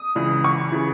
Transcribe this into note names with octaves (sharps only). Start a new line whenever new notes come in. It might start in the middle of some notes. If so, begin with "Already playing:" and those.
Already playing: D#6
C#2 C#3 E3
C#6
C#3 E3